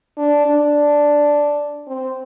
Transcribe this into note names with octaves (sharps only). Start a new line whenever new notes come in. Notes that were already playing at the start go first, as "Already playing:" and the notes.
D4
D4
C4